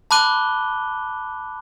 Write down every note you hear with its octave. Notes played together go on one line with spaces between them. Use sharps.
A5 B5 D6 F#6 D#7 G7